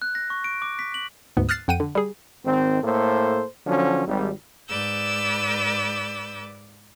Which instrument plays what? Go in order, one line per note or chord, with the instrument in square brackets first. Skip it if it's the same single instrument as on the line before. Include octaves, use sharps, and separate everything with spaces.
[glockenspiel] F#6
A#6
C#6
D7
D6
B6
F#7
[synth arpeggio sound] D2 G#2 B3
D#6 F6 F#6 A6 C7 E7
F2 F#5 G5 D#7
D3
G3 G#4
[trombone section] G#1 D#3 C4
A2 A#3 A4 C5
D3 F3 F#3 C#4
G#1 G3
[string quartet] G#2 B4 D5 D6 E6 G6